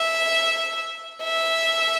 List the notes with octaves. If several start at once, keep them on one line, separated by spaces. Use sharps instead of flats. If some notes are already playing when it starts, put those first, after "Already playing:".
Already playing: E5
E5